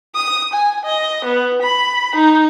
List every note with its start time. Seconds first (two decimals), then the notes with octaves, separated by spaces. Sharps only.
0.15 D#6
0.53 G#5
0.85 D#5
1.25 B3
1.62 B5
2.16 D#4